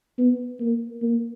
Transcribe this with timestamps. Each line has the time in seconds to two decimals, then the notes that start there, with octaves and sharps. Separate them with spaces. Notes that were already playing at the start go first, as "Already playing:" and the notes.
0.18 B3
0.60 A#3
1.02 A#3